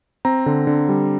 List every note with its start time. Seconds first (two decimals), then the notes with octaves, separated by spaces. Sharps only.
0.25 C4 A#5
0.46 D3
0.67 D3
0.89 G3